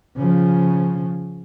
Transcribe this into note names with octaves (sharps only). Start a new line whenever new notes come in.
C#3 F3